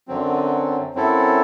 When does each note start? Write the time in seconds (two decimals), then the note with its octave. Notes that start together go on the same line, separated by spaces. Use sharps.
0.08 F#2 D3 F#3 C4
0.95 F#2 F#3 C4 E4 A4